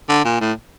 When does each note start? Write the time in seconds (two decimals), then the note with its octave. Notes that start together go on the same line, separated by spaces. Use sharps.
0.09 D3
0.25 A#2
0.41 A2